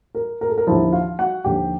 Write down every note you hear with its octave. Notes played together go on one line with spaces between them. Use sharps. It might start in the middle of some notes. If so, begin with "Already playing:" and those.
A#4
A#4
A4
A#4
D#2 D3 F3 E4 E5
F4 F5
F#4 F#5
D#2 D3 F3 G4 G5